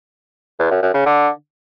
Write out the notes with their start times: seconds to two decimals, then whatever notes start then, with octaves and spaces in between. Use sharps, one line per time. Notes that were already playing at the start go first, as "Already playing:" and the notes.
0.59 E2
0.71 F#2
0.82 F#2
0.94 C#3
1.05 D3